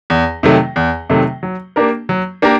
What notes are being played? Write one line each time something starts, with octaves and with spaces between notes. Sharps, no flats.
E2
C3 D#3 F#3 A3
E2
C3 D#3 F#3 A3
F#3
A#3 D4 G4 A#4
F#3
A#3 D4 G4 A#4